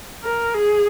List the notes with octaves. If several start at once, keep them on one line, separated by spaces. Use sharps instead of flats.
A#4
G#4